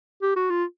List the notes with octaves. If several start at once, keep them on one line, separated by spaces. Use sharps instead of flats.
G4
F#4
F4